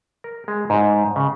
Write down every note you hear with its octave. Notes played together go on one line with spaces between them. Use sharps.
A#4
G#3
G#2
C#3